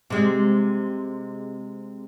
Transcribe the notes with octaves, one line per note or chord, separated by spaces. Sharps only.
C3 G#3